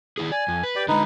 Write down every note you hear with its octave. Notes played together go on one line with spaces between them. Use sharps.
D#3 E4 G#4
D5 G#5
F2
B4
G4 D5 G5
D3 G#3 D#4 B4